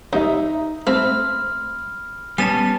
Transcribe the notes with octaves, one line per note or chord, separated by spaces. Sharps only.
D#2 D#4 E5
A3 C4 B5 F6
G3 B3 C#4 G#5 A5 A6 E7